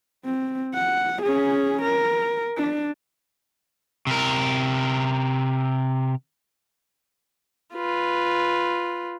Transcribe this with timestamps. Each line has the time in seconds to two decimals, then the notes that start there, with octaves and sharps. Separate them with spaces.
0.25 C4
0.75 F#5
1.22 C#4 G#4
1.82 A#4
2.57 D4
4.07 C3 A#4
7.74 F4 B4